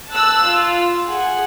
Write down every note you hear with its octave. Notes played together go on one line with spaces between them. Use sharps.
A5 E6 F#6
F4
G#4 F#5